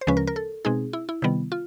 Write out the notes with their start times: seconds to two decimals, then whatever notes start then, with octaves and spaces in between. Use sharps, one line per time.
0.01 C5
0.07 D2 C#3 F3 G#3 C#4 B4
0.17 A#4
0.27 A#4
0.36 A4
0.65 B2 G#3 C4 D#4 G#4
0.93 E4
1.09 E4
1.22 C3 D#3 G3 B3
1.52 F4